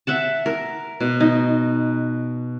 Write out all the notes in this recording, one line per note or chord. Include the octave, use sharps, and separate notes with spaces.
E5 F#5 A5
A#4
B2
D#4